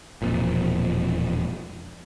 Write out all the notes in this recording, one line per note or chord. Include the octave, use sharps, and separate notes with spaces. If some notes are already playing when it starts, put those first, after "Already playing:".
E1 F2 A#2